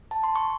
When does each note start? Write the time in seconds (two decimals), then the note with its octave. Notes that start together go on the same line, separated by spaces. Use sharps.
0.11 A5
0.24 C6
0.36 C#6